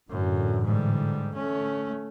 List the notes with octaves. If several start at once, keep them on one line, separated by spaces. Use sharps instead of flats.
F#2 A2 D3 E3
G#2 G3
A3 C#4